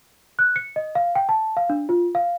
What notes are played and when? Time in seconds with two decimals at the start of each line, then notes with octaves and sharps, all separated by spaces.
0.39 F#6
0.56 C#7
0.76 D#5
0.95 F5
1.15 G5
1.29 A5
1.57 F5
1.70 D4
1.89 F4
2.15 F5